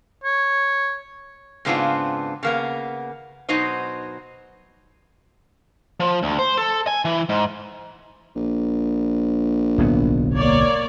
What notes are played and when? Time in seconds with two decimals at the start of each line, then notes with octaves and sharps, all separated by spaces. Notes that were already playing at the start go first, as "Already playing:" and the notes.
0.24 C#5
1.65 G#2 C#3 B3 C4 D4 F4
2.43 C#3 A#3 B3
3.49 B2 F#3 D#4 C5 D#5
6.00 F3
6.23 D2
6.39 C5
6.58 A4
6.87 G#5
7.05 E3
7.29 G#2
8.36 A#1
9.78 D1 B1 B3
10.36 A#3 C#5 D5